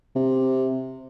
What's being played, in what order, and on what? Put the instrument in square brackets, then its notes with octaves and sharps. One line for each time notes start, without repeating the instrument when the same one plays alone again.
[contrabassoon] C3